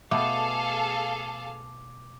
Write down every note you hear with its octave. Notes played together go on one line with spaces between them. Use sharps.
B2 A3 B3 G#4 A4 F5 D6